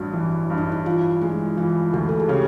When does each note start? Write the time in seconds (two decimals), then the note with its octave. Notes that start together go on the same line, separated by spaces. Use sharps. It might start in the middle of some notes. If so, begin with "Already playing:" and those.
Already playing: A1 G2 F#4
0.13 E3
0.50 G2
0.58 D#4
0.72 E4
0.85 E3 F4
1.22 G#3 E4
1.57 E3 F4
1.93 D2 F#4
2.09 A4
2.20 G#4
2.28 C#3 G4